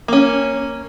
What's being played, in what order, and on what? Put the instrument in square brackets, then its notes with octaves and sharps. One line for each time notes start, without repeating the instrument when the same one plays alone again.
[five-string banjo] A#3 C#4